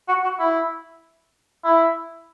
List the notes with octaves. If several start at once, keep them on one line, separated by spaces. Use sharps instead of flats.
F#4
F#4
E4
E4